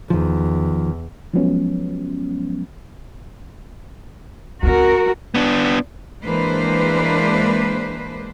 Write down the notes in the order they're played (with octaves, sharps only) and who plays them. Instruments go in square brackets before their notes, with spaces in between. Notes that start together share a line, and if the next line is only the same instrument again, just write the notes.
[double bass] E2 [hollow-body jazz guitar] D#3 F3
[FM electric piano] F3 F#3 G#3 B3 C#4
[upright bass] C#2 C4 [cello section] F#4 A#4
[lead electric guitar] B3 D4
[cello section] E3 G#3 A#3 D4 B4 C5